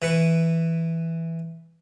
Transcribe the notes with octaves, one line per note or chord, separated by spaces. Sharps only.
E3 B4 C#6